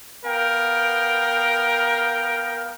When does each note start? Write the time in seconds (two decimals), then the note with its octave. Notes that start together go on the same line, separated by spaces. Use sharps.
0.25 B3 A#4 F5 G5